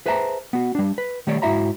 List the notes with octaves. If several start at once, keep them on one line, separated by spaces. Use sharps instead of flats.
G#4 B4 C5 E5 A5 A#5
B3 F#4
G3 D4
B4
D#3 G3 A3 C#5 D5
G#2 E4 F#4 E5 A#5 B5